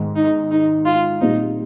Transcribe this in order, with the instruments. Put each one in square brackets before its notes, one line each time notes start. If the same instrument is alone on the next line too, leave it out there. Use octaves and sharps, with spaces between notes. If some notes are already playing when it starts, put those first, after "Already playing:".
Already playing: [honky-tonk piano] G#2 D#3 G#3
[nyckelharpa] D#4
D#4
F4
[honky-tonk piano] A#1 A#2 G3 C4 [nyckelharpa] D#4